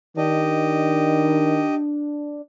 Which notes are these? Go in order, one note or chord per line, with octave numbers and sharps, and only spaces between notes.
D#3 D4 G4 D#5